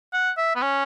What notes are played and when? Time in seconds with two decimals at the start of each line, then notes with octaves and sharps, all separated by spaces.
0.13 F#5
0.38 E5
0.56 B3
0.62 C#4